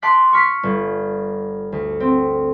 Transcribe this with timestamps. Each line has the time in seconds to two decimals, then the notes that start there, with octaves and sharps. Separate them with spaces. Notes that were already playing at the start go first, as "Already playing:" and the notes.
0.02 A5 C6 D6 F#6 B6
0.33 C#6 F6 B6 C7
0.63 G1
1.72 D2
2.00 C4